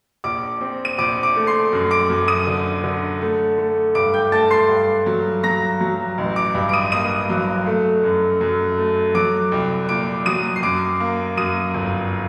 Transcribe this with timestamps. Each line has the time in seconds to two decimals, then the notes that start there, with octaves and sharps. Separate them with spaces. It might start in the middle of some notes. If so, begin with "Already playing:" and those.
0.24 A#1 D6 D7
0.61 C4
0.85 D#7
0.98 A#1 D6 D7
1.23 D6 D7
1.35 A3
1.47 C6 C7
1.73 F#2
1.91 D6 D7
2.10 F#2
2.28 D#6 D#7
2.47 D3
2.84 D3
3.21 A3
3.58 A3
3.95 G2 D6 D7
4.14 G5 G6
4.32 A3 A5 A6
4.51 C6 C7
4.69 G2
5.06 F#3
5.43 F#3 A#5 A#6
5.81 F#3
6.18 A1
6.36 D6 D7
6.55 G2
6.69 D7
6.73 D#6 D#7
6.92 A#3 D#6 D#7
7.29 F#3
7.66 A3
8.03 F#2
8.41 F#2
8.78 A3
9.15 F#3 D6 D7
9.52 C2
9.89 A#2 D6 D7
10.26 F#3 D#6 D#7
10.56 C7
10.63 F#2 D6 D7
11.00 A#3
11.37 F#2 D#6 D#7
11.74 G1